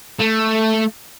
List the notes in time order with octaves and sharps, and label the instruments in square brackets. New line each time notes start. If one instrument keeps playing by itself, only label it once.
[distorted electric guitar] A3